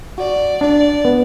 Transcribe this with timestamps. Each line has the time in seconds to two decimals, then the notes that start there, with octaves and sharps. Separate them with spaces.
0.18 F#4 D5
0.61 D4 D5
1.05 B3